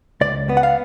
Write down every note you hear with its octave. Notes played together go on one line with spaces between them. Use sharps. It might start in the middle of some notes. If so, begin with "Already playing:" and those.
C#2 D5
B3
F#5
F5